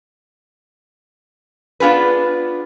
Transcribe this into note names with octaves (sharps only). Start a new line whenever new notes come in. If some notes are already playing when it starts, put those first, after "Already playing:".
B3 D4 F4 G#4 B4